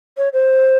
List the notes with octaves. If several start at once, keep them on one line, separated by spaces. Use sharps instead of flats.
C#5
C5